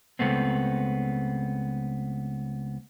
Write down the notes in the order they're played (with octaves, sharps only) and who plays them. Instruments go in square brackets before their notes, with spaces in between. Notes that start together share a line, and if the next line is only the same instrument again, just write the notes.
[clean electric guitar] C#2 F#2 A3 B3 C4